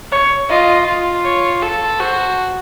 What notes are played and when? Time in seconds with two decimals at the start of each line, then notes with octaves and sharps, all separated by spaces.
0.12 C#5
0.50 F4 D#5
0.87 F4
1.24 C#5
1.62 A4
1.99 F#4 C5